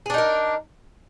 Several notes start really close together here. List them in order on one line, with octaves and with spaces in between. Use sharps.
G#4 D4 D#4 A#4